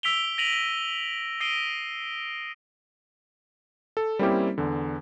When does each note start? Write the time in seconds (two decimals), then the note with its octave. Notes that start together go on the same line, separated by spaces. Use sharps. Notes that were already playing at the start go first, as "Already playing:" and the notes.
0.03 E6 B6 D7 F7 G7
0.38 A#6 D7 D#7 F7 F#7
1.40 D#6 A#6 C7 D7 D#7 G7
3.97 A4
4.19 G3 A#3 C4 C#4 E4 G4
4.58 E2 D3